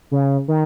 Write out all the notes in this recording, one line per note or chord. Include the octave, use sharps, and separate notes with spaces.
C#3
D#3